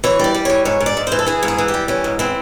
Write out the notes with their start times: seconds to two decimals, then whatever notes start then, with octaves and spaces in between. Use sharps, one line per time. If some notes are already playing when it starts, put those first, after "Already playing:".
0.04 E3 C#5
0.20 G3 D5
0.35 G3
0.45 E3 C#5
0.65 G#2 C#5
0.80 G#2
0.86 D5
0.97 G#2
1.07 E3 C5
1.19 A4
1.26 E3 G#4
1.43 G#2
1.48 G#4
1.58 E3
1.68 G4
1.74 G3
1.88 E3 C#4
2.04 G#2
2.19 E3 C4